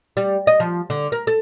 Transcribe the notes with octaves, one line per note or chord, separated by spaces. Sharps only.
G3
D#5
F3
D3
A#4
A4